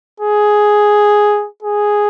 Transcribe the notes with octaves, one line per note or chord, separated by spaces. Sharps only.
G#4
G#4